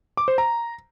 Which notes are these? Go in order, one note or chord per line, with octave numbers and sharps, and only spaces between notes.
D6
C5
A#5